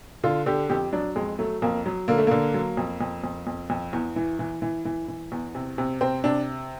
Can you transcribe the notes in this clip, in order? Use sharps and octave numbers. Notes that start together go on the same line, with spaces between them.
D3 F4
D3 G4
F2 G4
F#3 D4
F2 G#3
F#3 A3
F2 A#3
F#3
D3 A#3
A3
D3 A#3
F#3
F2
F2
F2
F2
F2
E2
E3
E3
E3
E3
E3
E2
C3
C3
C3 C4
C3 D4